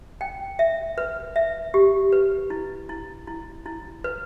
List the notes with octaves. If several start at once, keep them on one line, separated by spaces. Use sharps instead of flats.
G5
E5
B4
E5
G4
B4
E4
E4
E4
E4
B4